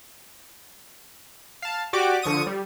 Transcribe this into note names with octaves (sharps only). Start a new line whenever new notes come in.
F5 A5
F#4 G4 D5 D6
D3 F3 C#6 D#6 D#7
G3